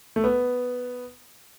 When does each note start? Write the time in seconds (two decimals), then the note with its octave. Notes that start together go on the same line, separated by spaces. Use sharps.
0.16 A3
0.24 B3